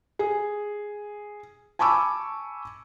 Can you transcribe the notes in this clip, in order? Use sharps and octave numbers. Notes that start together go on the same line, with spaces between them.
G#4
G#5 A5 B5 C#6 D6 E6